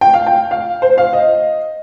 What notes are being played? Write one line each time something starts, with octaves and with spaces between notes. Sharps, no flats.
G5
F5
G5
F5
C5
F5
D#5